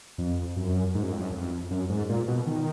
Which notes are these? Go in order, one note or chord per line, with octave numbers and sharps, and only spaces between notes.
F2
F#2
G#2
F#2
F2
F#2
F2
F#2
G#2
A#2
B2
D#3